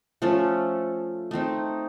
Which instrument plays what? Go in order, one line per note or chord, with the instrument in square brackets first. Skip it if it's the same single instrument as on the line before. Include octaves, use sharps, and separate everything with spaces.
[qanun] F3 A3 C#4 A4
A3 C4 D#4